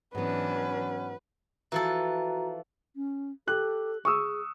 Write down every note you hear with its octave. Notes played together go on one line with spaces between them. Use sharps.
G#2 E3 F#3 B3 C#4 D4 B4
E3 F3 F#4 A4 A#5
C#4
G4 A4 F#6
G#4 C#6 D#6 E6